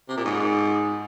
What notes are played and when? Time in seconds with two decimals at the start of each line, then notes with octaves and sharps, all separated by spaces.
0.09 C3
0.17 A#2
0.25 G#2